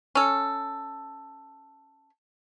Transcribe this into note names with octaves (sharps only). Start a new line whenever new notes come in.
C#4 A4